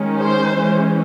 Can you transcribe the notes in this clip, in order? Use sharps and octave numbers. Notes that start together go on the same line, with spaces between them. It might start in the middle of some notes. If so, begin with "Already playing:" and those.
Already playing: D#3 G#3 C#4
C5
E3 G#3 C#4